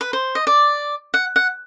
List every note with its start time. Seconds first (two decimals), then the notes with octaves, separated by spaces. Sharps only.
0.01 B4
0.13 C5
0.35 D#5
0.47 D5
1.14 F#5
1.36 F#5